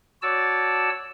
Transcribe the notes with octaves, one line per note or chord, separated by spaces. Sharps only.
F#4 C#5 D5 A5 E6